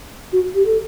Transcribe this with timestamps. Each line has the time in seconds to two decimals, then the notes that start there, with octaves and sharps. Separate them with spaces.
0.33 F#4
0.54 G4
0.65 A4